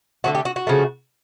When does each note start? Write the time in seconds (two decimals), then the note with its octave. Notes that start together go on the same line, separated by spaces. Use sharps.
0.24 D3 F#3 A3 F#4
0.35 G4
0.45 F#4
0.56 F#4
0.67 C#3 F3 A3